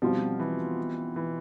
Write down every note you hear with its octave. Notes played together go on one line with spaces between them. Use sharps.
B2 F3 G3 C4 F4
E3
E3